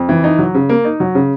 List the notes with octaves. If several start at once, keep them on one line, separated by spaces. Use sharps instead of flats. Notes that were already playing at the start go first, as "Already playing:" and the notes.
Already playing: F2
E3
D#4
F#3
C#3
A#3
D#4
F#3
C#3